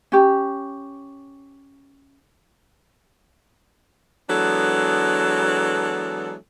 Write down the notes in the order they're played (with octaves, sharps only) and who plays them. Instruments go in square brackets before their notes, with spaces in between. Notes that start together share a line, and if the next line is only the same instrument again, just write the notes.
[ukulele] C#4 G4
[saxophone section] E3 F#3 G#3 B3 D4 A4